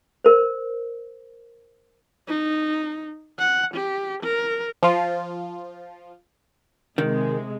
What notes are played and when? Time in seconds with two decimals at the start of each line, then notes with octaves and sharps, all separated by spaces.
0.25 A#4 C5
2.28 D#4
3.39 F#5
3.75 G4
4.24 A#4
4.83 F3 F4
6.98 C3 D#3 G#3